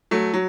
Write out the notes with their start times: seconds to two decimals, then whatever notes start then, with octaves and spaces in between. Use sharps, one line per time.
0.11 F#3 A3
0.34 F#3